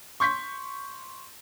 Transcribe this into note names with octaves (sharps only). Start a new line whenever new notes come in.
C6 C#6 G6 B6